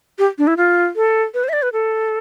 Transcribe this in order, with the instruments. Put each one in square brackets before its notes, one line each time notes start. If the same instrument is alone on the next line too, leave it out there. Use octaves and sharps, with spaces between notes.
[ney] G4
D4
E4
F4
A4
B4
C5
E5
D5
B4
A4